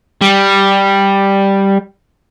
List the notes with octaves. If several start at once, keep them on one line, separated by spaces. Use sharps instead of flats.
G3